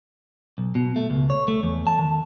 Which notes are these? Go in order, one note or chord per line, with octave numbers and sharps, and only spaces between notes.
B1
B2
A3
C#2
C#5
A3
E2
A5
D#3